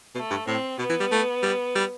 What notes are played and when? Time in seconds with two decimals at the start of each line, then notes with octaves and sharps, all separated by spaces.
0.15 B2 A3
0.31 G2
0.46 A2 C4
0.78 B2 B3
0.90 E3
1.00 G3
1.12 A3
1.43 G3
1.75 G3